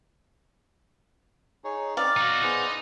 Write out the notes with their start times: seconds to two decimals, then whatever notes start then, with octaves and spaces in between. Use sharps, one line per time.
1.64 D#4 G#4 C#5
1.97 C4 D#4 D5 F5
2.17 D#4 F#4 F6
2.43 B3 D#4 G#4 C5